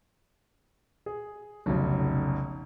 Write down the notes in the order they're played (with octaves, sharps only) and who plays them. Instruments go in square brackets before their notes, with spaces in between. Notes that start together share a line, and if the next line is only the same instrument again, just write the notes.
[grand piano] G#4
[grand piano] F1 B1 [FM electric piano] C#3 C#4 D#4